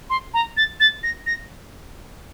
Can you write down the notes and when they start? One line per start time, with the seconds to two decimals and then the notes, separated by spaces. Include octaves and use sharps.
0.10 C6
0.34 A#5
0.57 A6
0.80 A6
1.03 A#6
1.27 A#6